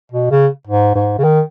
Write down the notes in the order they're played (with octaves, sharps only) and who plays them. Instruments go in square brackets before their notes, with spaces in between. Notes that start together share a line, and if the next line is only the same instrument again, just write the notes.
[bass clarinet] B2
C#3
G#2
G#2
C#3
D#3